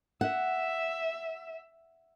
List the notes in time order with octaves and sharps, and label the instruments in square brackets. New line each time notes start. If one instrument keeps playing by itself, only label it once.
[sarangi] E5 [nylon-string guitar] F#5